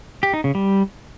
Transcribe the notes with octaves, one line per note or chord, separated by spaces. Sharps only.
G4
D#4
C#3
G3